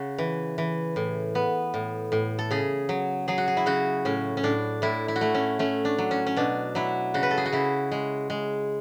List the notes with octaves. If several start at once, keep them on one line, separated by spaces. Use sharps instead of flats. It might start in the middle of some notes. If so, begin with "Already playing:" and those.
Already playing: C#3 F#4
E3
E3
A2
B3
A2
A2
A4
C#3 G#4
F#3
F#3 G#4
F#4
G#4
E4
C#3 F#4
A2 C#4
C#4
A2 D4
A2 E4
E4
F#4
A3 E4
C#4
A3 C#4
D4
F#3
C#4
C#4
B2 D4
F#3 E4
C#3 F#4
B4
A4
G#4
F#4
C#3 E4
G#3
G#3